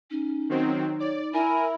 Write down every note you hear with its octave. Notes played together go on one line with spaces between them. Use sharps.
C#4 D#4
D#3 F#3 C4
C#5 D5
E4 A#4 G#5